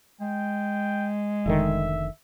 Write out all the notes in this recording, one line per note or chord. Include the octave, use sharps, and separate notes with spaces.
G#3 G5
F1 D3 D#3 E5